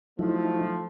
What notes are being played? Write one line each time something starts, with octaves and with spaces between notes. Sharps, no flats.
F3 F#3 A3 D#4 E4